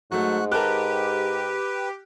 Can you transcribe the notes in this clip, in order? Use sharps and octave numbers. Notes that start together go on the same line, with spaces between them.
G#2 F#3 A3 F#4 F#6
G4 A#4 B4 A5 F#6